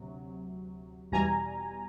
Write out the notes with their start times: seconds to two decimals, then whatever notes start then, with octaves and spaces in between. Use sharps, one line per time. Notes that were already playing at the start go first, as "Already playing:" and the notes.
Already playing: D2 C3 F#3
1.12 E2 B2 G3 G#5 A#5